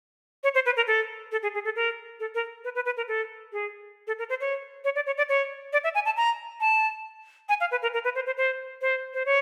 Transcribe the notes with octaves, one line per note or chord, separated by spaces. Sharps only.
C#5
C5
B4
A#4
A4
A4
G#4
G#4
A4
A#4
A4
A#4
B4
B4
B4
A#4
A4
G#4
A4
A#4
C5
C#5
C#5
D5
C#5
D5
C#5
D5
E5
G#5
A5
A#5
A5
G#5
F5
B4
A#4
A#4
B4
C5
C5
C5
C5
C5
C#5